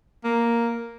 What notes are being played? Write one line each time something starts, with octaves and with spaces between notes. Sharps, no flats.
A#3